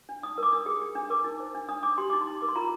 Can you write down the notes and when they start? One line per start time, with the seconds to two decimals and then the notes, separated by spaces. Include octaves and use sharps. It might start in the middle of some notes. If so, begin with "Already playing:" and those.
0.09 D4
0.23 D#4 D#6
0.38 A#4 D6
0.53 D4 D#6
0.66 G#4
0.81 G#4
0.95 D4
1.10 A#4 D6
1.24 D#4
1.40 C5
1.55 D4
1.69 D4 D#6
1.83 D4 D6
1.98 G4 C6
2.10 D#4 D6
2.21 C6
2.27 D#4
2.41 A#4 D6
2.49 C6
2.55 F4 A#5